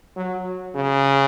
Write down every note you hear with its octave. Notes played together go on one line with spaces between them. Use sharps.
F#3
C#3